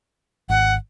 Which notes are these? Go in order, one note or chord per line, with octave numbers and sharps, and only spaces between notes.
G#1 F#5